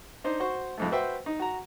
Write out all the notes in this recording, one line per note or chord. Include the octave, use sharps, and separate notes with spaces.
D4 D#4 C5
F#4 C5 C#6
F2 G#2 A3
F#4 B4 C5 E5 G5
D#4
F#4 A#5